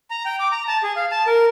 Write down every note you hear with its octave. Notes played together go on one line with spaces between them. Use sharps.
A#5
G5
D6
A#5
A5
G#4
F5
A5
A#4